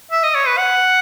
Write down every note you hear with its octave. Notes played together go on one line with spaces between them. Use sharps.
E5
D#5
C#5
B4
F#5